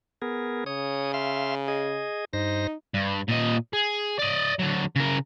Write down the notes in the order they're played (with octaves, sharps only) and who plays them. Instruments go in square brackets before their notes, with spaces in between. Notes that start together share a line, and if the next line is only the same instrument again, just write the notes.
[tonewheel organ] B3 G#4 A#4
[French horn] C#3 [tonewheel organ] C#5 D#6
[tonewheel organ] E5 F5 C6
G#4 D#5
[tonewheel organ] G2 C5 A#6 [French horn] D#4
[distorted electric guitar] G2
A#2 D#5
G#4
D5 D#5
D3 F#3
C#3 A#4